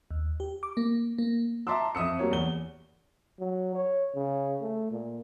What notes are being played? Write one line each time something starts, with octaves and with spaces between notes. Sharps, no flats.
D#2
G4
D6
A#3
A#3
E5 A5 A#5 C6 D6 E6
F2 E5 D#6 E6 C#7
F#3 G3 A#3 F#4 C#5
E2 G7
F#3
C#5
C#3
A3
A#2